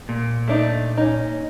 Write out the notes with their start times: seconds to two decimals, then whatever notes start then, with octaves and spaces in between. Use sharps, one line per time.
0.09 A#2
0.48 A3 D4 D#4
0.97 C#4 D#4